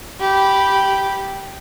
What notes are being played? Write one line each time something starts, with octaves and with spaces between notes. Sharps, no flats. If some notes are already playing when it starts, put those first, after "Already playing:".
G4 B5